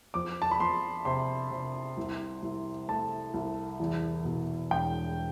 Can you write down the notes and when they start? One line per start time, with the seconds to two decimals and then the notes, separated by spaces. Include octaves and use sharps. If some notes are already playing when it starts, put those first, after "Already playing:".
0.14 F2 D6
0.42 A5
0.51 B5
0.60 F2 C6
1.05 C3 C6
1.51 C3
1.97 C2
2.43 C2
2.88 A3 A5
3.34 C2
3.80 E2
4.25 B2
4.70 E1 G5